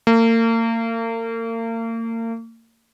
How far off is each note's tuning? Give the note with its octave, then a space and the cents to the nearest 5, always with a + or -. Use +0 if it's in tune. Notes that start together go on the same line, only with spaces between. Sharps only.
A#3 -40